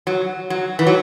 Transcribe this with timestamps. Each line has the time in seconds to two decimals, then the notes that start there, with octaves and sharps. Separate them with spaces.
0.07 F#3
0.50 F#3
0.79 E3
0.87 F#3